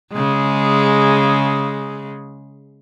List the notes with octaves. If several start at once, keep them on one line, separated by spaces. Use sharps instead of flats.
C#3 G#3